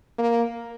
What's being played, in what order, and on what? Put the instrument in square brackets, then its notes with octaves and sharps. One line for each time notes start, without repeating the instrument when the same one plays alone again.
[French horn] A#3